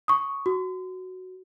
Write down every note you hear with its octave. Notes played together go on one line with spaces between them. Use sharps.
C#6 D#6
F#4